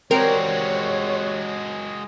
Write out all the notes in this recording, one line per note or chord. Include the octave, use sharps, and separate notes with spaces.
G3 G#3 C4 F#4 A#4 C#5